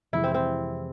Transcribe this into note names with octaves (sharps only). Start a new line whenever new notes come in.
F2 C3 E3 G#3 E4
C4
C4